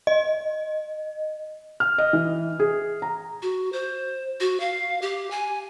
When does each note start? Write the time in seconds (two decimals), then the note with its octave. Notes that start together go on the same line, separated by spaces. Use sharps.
0.07 D#5
1.80 F6
1.98 D#5
2.13 E3
2.60 G#4
3.02 A#5
3.42 F#4
3.73 C5
4.40 F#4
4.60 F5
5.02 G4
5.31 G#5